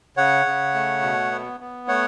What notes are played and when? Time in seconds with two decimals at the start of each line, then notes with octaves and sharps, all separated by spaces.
0.17 C#3 C#5 F#5
0.46 C#3
0.74 A3
1.02 B2
1.32 B3
1.60 B3
1.88 A3 C#5 F#5